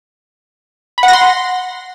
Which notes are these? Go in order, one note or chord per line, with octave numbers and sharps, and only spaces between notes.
B5
F#5
A#6
C6